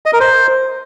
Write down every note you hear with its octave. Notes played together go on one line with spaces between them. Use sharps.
D#5
A#4
C5